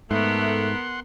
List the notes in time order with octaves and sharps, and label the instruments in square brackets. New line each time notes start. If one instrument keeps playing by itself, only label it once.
[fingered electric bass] G#2 [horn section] A3 [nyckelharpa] B3 A#4 [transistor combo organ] F#5 C6